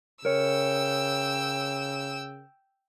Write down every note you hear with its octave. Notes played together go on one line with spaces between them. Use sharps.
C#3 A#4 C#5 G5 E6